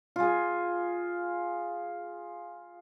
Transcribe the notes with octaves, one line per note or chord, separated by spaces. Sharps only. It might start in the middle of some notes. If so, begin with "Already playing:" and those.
F4 G#4